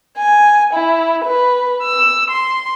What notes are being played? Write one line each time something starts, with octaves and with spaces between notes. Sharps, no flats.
G#5
E4
B4
E6
C6